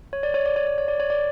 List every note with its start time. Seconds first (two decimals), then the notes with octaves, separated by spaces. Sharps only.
0.13 C#5
0.23 D5
0.34 C#5
0.46 D5
0.56 C#5
0.66 D5
0.78 C#5
0.88 D5
1.00 C#5
1.10 D5